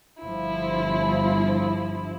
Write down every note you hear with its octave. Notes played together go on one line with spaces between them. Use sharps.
G1 F3 E4